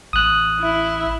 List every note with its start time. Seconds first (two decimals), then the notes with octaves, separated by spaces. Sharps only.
0.13 A1 D#6 F#6
0.60 E4